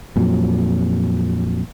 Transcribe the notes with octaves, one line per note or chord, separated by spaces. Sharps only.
F2 A#2 F#3